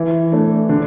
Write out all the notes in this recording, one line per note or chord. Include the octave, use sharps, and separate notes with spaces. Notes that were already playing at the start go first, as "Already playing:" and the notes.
Already playing: E3
A3 D4
D3